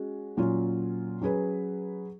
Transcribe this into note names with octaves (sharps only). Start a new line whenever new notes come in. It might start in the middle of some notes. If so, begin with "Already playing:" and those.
Already playing: G#3 C#4 F#4
A#2 F#3 C#4 F4
F#3 C#4 G#4 B4